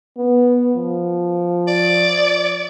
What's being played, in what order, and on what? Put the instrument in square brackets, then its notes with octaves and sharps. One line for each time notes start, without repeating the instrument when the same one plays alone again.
[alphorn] B3
F3
[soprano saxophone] D5